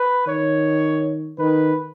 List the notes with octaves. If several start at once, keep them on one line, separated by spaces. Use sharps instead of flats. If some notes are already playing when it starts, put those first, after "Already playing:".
Already playing: B4
D#3 C#5
D#3 B4